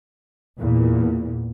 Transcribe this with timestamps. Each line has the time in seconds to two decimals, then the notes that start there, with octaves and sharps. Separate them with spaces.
0.58 E2 A#2